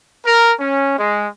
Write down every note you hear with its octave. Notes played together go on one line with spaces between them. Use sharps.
A#4
C#4
G#3